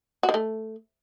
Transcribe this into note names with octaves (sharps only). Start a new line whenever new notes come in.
F#4
D#3
A3